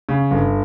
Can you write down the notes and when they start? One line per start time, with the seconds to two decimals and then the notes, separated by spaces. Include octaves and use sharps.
0.09 C#3
0.31 G1